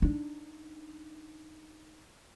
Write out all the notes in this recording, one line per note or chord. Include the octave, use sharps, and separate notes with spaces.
D4 D#4